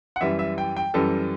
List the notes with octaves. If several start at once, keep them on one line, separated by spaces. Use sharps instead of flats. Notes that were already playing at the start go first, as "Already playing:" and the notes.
F#5
F#2 E3 G3 E5
E5
G5
G5
F#2 E3 G3 A4